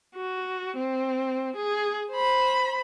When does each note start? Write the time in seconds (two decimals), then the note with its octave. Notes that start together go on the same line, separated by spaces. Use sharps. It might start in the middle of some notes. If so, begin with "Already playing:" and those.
0.15 F#4
0.76 C4
1.56 G#4
2.12 C5 B5